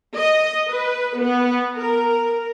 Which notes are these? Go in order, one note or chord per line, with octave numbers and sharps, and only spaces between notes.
D#5
B4
B3
A#4